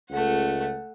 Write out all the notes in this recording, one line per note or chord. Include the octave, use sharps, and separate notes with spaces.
C#2 A3 F#5